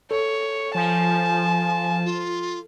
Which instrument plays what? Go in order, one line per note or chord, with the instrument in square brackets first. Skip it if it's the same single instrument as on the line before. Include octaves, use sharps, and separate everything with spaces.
[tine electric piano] A4 [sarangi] C#5
[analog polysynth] F3 [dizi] G#5 [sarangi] A5
[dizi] F4